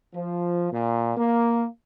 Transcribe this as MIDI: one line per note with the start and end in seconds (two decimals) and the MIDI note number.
0.14 0.72 53
0.72 1.16 46
1.17 1.67 58